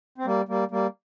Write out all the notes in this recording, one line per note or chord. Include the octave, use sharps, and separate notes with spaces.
C4
G3 A#3
G3 A#3
G3 A#3